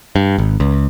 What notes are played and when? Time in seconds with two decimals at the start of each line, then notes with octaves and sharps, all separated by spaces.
0.16 G2
0.38 G#1
0.60 C#2